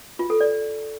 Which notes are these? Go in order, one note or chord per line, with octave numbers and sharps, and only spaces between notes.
F4
A4
D5